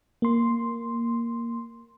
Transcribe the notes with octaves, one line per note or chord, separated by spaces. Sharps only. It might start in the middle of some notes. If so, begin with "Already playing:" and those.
A#3 C6